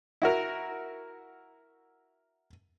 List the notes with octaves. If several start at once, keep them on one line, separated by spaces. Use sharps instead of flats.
E4 F#4 A#4